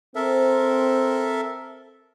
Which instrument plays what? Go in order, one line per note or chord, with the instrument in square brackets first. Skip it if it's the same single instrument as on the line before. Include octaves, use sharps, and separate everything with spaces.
[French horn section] C4 [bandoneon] A4 A#4 E5